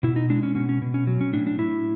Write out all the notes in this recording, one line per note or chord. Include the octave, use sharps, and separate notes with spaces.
B2 E4
D#4
G#3 D4
C#4
B2 C#4
C#4
B2
C#4
F#3
C#4
A2 D4
D4
A2 E4